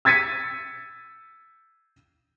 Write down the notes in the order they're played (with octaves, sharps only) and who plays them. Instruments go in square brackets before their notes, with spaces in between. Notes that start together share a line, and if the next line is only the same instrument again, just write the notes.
[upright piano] E6 G#6 A6 B6 C#7 D#7